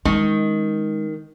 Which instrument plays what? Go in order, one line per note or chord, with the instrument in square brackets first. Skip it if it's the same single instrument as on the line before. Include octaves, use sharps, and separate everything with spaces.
[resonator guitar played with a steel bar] D#3 [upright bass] G#3 C#4